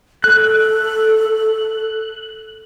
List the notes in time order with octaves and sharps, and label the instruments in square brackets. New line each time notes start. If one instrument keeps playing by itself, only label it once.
[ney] A4 [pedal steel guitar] F#6